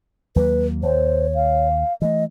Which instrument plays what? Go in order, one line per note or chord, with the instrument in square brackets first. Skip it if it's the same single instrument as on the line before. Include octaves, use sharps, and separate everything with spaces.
[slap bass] D#2 F#3 A#3 [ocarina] B4
[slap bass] D#2 [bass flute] C5 [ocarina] C#5
[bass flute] F5
[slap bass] E3 A3 [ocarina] D#5